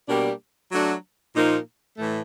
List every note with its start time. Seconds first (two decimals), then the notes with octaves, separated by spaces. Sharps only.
0.07 B2 G3 A#3 D4 G4
0.71 F#3 A3 D4 F#4
1.35 A#2 F3 A#3 D#4
1.97 A2 E3 A3